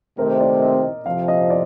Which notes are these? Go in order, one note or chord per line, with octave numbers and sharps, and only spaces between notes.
C3 D#3 A3 C4 A#4
D5
D#5
F2 C3 F3 F5
D#5
D5